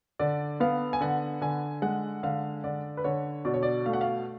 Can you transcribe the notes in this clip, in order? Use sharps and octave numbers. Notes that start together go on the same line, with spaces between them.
D3 D5
B3 F5
G#5
D3 F#5
D3 G#5
G#3 F#5
D3 F5
D3 D5
B4
D3 C#5
B2 D5
C#5
D5
A3 F5
F#5
F5